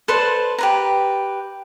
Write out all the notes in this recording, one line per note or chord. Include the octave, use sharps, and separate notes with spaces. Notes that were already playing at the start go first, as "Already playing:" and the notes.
A4 B4 C5 D5
G4 B4 A#5